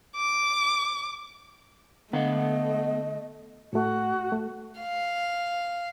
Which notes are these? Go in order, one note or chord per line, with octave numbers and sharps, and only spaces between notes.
D6
D3 A3 B3 D#5 F5 F#5
A2 A3 F#4
A3
F5